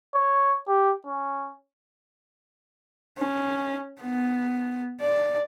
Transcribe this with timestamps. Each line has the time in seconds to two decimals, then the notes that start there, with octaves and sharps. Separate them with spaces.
0.14 C#5
0.68 G4
1.06 C#4
3.18 C#4
4.01 B3
5.01 D5